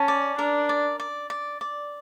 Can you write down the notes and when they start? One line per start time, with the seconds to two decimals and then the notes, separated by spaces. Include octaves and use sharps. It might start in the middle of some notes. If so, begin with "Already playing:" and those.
Already playing: C#4 A5
0.08 D5
0.38 D4 A#4
0.69 D5
1.00 D5
1.30 D5
1.61 D5